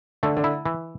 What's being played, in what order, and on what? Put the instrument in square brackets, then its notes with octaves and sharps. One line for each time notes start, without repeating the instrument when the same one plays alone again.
[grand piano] D3 [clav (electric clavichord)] A3
[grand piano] D3
[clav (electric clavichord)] E4
E3